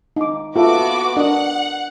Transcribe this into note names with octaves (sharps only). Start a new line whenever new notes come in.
D#4 D6
B3 F4 F#4 A4 E5 D6
D4 A#4 D#5 F#5